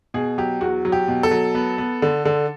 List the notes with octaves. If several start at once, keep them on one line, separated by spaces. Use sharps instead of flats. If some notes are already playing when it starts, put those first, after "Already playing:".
B2 G#4
F#3 G4
E2 F#4
F#3
G4
B2
A4
F#3
B3
B3
D3
D3